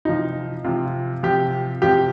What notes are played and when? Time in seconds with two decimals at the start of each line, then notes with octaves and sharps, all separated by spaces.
0.05 C3 F3 D#4
0.64 C3 F3 F4
1.23 C3 F3 G4
1.82 C3 F3 G4